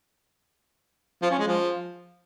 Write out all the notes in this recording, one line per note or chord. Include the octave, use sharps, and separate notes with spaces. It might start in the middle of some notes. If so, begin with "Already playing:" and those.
F3
C#4
G#3
F3